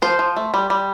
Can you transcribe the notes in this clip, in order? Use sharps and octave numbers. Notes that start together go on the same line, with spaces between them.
F3 C5
F3
A3
G3
G3